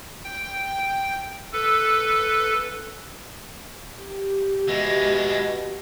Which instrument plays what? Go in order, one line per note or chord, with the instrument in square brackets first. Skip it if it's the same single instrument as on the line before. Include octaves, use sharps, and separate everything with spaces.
[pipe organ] G5
A4 B4
[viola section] G4
[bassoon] B2 [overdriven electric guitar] E3 G#3